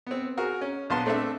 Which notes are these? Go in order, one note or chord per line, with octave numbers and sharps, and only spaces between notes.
B3 C4
F#4 G#4 A#4
C#4
A#1 B3 A5 C6
A3 C4 D4 A4 E5